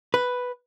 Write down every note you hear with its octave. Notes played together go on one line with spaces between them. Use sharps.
B4